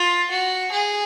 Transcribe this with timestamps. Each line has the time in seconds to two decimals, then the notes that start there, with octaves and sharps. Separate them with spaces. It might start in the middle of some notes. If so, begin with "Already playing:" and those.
Already playing: F4
0.30 F#4
0.72 G#4